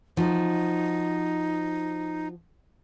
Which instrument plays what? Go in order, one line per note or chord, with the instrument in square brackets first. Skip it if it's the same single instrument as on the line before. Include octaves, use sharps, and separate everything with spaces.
[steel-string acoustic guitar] F3 F#4 [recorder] D#4